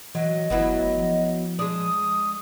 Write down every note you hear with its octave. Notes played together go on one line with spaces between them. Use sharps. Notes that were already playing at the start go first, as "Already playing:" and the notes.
E3 F#3 D#5
F#1 F#3 B3 E4
F3
G#3 D4 D#6